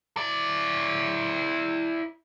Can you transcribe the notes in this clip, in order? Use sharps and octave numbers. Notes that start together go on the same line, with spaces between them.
E4 D5